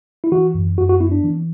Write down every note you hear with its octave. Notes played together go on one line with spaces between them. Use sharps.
E4
E3 F#4
F#2
F#2 F#4
F#4
B3 E4
D4
E3